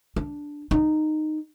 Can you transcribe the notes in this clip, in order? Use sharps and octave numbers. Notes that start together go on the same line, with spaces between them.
D4
D#4